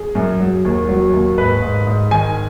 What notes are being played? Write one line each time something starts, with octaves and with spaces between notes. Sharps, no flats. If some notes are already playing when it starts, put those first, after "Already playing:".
Already playing: G#4
F#2
F#3
D#2
F#3
D#2
G#2 B4
G#2
G#2
D#3 G#5